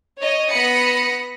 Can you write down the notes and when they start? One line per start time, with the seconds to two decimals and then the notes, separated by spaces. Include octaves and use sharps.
0.20 C#5 D#5
0.50 B3 B5 D#6 A#6 C#7